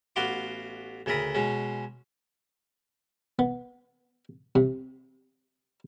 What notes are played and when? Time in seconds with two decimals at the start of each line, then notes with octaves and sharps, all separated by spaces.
0.16 A1 B3 F#4 F5 C6 D6
1.06 D2 C#3 A4 A#4 B5 D#6
1.35 B2 G#3 C#4
3.39 B3
4.55 C3